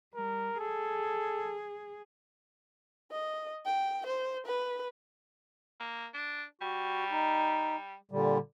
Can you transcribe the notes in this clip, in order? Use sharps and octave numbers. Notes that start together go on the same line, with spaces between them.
G3 A#4
G#4 A4
D#5
G5
C5
B4
A#3
D4
G3 F#4
D#4
A#2 D3 G3